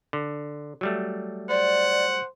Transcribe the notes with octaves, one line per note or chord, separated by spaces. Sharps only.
D3
F#3 G3 A3
C5 D5 F#5